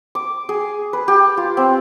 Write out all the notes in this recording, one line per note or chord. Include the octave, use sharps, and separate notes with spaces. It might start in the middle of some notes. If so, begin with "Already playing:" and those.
D6
G#4
B4
G4
F4
C4